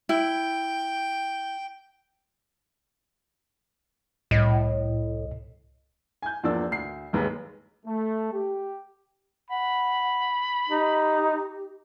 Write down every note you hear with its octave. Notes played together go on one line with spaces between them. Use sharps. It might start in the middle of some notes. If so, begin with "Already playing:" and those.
E4 G5
C2 A2 D#5
G#5 G6
E2 F3 A#3 D4 D5 E6
D2 C7
F#1 D#2 G#3 B4
A3
G4
F#5 B5
D#4 G4